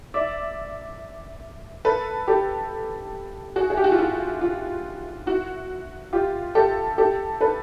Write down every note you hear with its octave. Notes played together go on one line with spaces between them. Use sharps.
D5 E5
A4 B4
G4 A4
F#4 G#4
G#4
G4
F#4
F4
E4
F4
E4 F#4
F4 G4
G4 A4
G4 A4
A4 B4